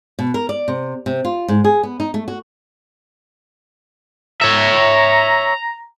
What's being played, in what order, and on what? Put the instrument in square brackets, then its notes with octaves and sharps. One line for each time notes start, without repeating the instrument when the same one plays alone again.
[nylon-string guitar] B2
A#4
D5
C3
C3
F4
G#2
G#4
B3
D#4
A3
F#4
[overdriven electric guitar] C#5 E5 [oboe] A#5